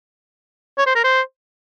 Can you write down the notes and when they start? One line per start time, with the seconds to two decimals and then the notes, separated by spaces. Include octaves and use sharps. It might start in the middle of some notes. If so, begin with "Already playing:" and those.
0.78 C#5
0.86 C5
0.95 A#4
1.04 C5